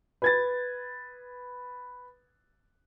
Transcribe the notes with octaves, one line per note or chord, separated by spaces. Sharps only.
B4 G#6 A6